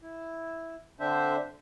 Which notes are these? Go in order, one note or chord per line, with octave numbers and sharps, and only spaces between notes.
E4
D3 C4 D4 C5 E5